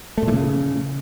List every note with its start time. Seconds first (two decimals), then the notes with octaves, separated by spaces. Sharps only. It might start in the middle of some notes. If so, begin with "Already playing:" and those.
0.18 A3
0.23 A#2
0.28 E3
0.33 C#3